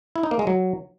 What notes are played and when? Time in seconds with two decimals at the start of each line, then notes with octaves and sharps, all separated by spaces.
0.16 E4
0.23 D#4
0.31 A#3
0.39 G#3
0.47 F#3